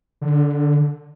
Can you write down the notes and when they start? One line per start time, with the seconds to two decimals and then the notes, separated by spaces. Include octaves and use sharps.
0.21 D3